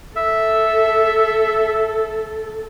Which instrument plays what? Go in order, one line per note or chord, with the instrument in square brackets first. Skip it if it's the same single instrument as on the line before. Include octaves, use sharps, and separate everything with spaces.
[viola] A4 [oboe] E5